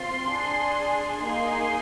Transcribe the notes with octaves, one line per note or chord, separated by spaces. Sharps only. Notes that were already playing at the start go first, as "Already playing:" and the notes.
Already playing: C4 F4 C6
D4 G#4
A#3 D#4 G#4 C6